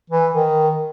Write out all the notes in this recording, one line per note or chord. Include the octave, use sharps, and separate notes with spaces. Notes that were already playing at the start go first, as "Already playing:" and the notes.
E3
D#3